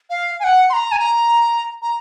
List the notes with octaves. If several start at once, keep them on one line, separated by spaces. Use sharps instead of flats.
F5
G#5
F#5
C6
A#5
G#5
A#5
A#5